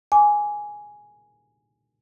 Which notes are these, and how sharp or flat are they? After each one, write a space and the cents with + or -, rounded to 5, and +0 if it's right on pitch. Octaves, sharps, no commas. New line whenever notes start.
G#5 +0 D6 -20